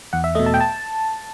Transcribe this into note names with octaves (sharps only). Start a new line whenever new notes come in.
E2 F#5
E5
B2 A3 D#5
A5
G5
A5